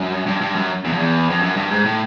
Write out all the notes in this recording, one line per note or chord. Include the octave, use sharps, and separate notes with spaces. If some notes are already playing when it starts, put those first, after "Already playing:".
Already playing: F#2
G2
G2
F#2
E2
F2
E2
F2
F#2
G2
G#2
A2